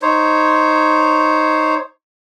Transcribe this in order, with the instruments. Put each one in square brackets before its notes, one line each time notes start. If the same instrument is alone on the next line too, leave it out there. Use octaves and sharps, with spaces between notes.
[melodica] D#4 C5 C#5